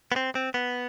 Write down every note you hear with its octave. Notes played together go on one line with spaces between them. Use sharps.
B3
C4
C4
B3